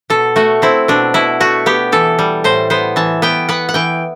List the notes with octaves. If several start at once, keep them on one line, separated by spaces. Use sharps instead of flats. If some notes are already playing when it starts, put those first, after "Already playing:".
B2 A4
A3 F#4
C4 E4
B2 D4
B2 E4
A3 F#4
B3 G4
E3 A4
G3
A2 C5
B3 C5
E3 A5
B3 G5
B3 F#5
F#5
E3 G5